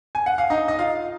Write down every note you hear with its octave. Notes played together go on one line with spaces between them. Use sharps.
G#5
F#5
F5
D#4 D#5
D#5
F4 F5